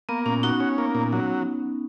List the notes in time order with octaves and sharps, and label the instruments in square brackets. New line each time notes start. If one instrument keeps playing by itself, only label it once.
[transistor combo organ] A#3 [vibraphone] B3
[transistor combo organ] A#2 [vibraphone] C#4
[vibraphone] D#4 [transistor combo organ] F#4
[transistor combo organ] C#4
A#3
A#2
F#3